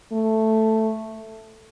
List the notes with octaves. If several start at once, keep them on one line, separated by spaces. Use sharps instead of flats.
A3